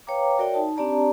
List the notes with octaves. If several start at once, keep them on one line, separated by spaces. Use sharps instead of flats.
B4 C#5 F5 G5 A#5 D6
F#4 A#4 C#5 D5 E5 G5
D#4 A5
C4 D4 G4 D5 A5 A#5